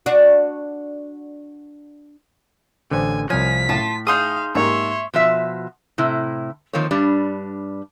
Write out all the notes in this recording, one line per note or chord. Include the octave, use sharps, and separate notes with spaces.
D4 F#4
A1 D3 C5 G#5
C2 F3 C#5 F5 G#5 B6
A2 F4 A5
D#4 G#4 F5 C6 D#6
G#2 A#3 G4 C#5 E5 C6
B2 F3 F4 E5
A2 C3 E4
D#3 F3 A#3 C4 C#5
G2 G3 D4